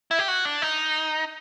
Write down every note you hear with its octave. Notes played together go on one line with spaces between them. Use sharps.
E4
G4
F#4
D4
D#4